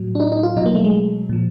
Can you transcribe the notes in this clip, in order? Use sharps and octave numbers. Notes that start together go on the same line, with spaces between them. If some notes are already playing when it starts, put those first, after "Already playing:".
Already playing: A2 F#3
D4
D#4
D#4
F4
B2 F#3 D#4
A#3
A3
G#3
A#2 F3